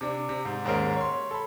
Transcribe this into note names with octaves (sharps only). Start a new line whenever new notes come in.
C3 D4
C3
G#2
D#2 G#2 G#3 C#4 A#4
C#5 C6
A4 B5